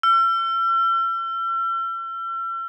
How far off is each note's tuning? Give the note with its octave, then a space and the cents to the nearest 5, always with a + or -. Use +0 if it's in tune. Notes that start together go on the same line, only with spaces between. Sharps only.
E6 +45